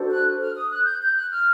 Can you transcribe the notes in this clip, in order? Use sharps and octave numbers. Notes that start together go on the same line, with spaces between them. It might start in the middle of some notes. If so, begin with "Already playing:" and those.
Already playing: D4 F#4 A4 C5
F#6
F6
D#6
F#6
G6
G6
F#6
F6